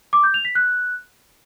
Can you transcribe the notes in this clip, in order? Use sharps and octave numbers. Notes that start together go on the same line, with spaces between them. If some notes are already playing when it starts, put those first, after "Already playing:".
D6
G6
F7
B6
F#6